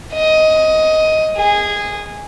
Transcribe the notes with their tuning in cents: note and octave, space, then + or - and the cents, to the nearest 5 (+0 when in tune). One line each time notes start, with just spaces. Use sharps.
D#5 +10
G#4 -15